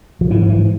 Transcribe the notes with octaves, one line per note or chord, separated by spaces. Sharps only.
F3
G#2 E3
F3
E3